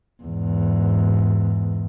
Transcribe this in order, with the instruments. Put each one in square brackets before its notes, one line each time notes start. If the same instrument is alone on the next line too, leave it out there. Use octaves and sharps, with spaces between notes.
[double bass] E2 G#2